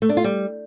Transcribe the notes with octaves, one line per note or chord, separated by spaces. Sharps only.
A3
D4
F4
G3